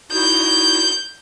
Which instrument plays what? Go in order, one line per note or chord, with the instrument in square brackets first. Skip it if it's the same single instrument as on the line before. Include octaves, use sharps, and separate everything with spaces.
[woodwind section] D#4 E4 F#4 [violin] G6